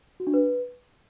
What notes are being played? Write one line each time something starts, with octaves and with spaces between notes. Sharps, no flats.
F#4
D4
B4